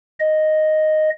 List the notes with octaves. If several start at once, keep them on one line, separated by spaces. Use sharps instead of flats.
D#5